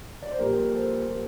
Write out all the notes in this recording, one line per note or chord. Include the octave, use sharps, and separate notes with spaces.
D5
C5
A#1 A#2 G3 G4 A#4
A4 C5
A#2 G3